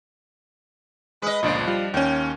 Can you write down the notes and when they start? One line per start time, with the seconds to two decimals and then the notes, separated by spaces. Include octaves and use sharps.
1.22 G#3 B4 D#5
1.43 G1 C#2 A#2 F3 D4 D#5
1.68 G3 F4
1.94 D#2 C#4 G5